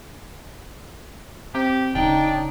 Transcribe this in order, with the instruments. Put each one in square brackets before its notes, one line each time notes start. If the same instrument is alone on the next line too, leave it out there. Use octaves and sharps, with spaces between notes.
[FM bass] C4 [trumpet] G4
[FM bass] D1 [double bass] C#3 D#4 [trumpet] D4 [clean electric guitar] G5